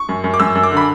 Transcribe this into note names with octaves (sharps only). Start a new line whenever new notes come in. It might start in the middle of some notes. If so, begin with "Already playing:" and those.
Already playing: C#6
F#2
F#2
D6
F#2 E6
F#2
D6
D3
B5